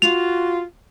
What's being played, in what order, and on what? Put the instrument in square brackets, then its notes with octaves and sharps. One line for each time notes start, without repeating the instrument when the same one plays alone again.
[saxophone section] F4 F#4 [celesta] F7